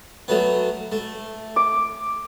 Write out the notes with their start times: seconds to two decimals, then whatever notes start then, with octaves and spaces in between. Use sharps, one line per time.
0.28 F#3 A3 B3
0.92 A3
1.56 D6